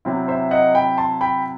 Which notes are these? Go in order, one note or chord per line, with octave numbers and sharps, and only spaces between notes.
C3 F#3 C4 E4
C5 E5
D#5 F#5
G5 B5
A5 C6
G5 B5